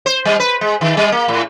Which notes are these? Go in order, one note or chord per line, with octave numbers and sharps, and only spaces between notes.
C5
G3
B4
G#3
D#3
G3
A#3
A2